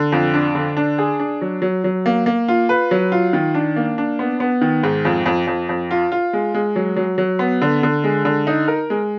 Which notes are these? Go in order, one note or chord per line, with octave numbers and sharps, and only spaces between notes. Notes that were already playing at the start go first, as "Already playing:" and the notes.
Already playing: D3
F2
D4
D3
D4
G#4
D4
F#3
F#3
F#3
A#3
A#3
F4
B4
F#3
F4
D#3
D4
A#3
D4
B3
B3
D#3
G#2
F2
F2
F2
F2
F4
F4
G#3
G#3
F#3
F#3
F#3
B3
D3
D3
G#3
D3
D#4
A#4
G#3